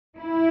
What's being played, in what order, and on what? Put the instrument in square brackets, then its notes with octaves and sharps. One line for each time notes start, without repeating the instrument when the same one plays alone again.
[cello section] E4